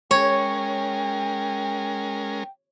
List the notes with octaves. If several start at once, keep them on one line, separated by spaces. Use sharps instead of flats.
G#3 C#4 A#4 C#5 G5